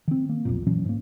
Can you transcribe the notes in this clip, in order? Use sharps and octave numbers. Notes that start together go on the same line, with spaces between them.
D#3 C4
A#3
B1 F2 A#2
A#2 E3 F#3 C#4
G#2 A#3